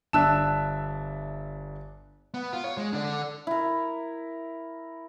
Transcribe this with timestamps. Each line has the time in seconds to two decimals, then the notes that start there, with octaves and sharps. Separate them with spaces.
0.13 G1 D4 E5 A5 E6 F#6
2.34 B3
2.53 F4
2.64 C#5
2.77 G#3
2.93 D3 D4
3.47 E4 A#4